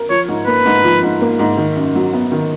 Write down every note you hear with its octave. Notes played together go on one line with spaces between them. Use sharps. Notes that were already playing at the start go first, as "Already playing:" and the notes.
Already playing: A#4
F3 C#5
G#2
A#3 B4
G#2
F3
G#2
A#3
G#2
D#3
F#2
F#3
B3
D#3